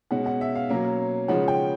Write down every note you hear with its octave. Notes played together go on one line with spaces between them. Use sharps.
B2 G#3 C#4 F#5
F#5
E5
F5
B2 F#3 A#3 C#4
C#3 F3 G#3 C#4 F#5
G5